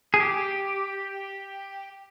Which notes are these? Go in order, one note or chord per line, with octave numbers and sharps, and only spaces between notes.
G#4
G4